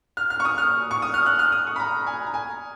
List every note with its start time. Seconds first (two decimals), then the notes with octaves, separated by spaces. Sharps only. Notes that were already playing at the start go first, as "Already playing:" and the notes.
0.17 F6
0.30 F6
0.40 C#6
0.45 D#6
0.58 F6
0.91 C#6
1.02 D#6
1.14 F6
1.26 F#6
1.39 F6
1.52 D#6
1.67 C#6
1.76 B5
1.80 A#5
2.07 G#5
2.26 A#5
2.34 G#5